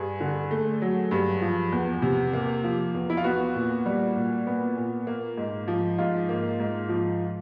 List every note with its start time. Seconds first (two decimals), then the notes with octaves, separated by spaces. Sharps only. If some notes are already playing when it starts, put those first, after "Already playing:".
Already playing: G2 G#4
0.21 D3
0.51 A3
0.82 F#3
1.11 G2
1.41 F3
1.72 E2
2.02 C3
2.33 A#3
2.64 F3
2.94 E2
3.10 E4
3.17 F4
3.24 B3 F#4
3.55 A#2
3.86 G3
4.16 A#2
4.47 B3
4.77 A#2
5.07 A#3
5.37 G#2
5.68 F3
5.98 G#2 F4
6.29 A#3
6.60 G#2
6.89 F3